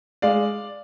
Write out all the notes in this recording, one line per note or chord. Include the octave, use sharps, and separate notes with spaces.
G#3 D5 F5